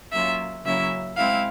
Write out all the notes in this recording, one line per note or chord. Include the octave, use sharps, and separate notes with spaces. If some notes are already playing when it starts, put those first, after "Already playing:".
F#3 A#3 C#4 F4 E5
C#3 F#3 A#3 C#4 E4 E5
G#3 C4 E4 F5